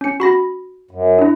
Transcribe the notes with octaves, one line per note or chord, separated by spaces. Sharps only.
C#4 C#7
F#4 B5 A#6
F#2
D4 E4